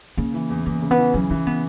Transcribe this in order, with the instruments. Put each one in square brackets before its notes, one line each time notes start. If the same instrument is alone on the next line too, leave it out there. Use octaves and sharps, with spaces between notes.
[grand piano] C#3 [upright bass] A#3
[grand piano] E3
E2
[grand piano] E2 [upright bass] A#3
[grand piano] C#3
[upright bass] B3
[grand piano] E3
[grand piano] C#3 [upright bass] F#3
[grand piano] E3 [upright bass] C#4
[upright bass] B3